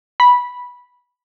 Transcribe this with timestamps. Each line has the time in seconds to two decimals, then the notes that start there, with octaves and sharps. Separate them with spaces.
0.20 B5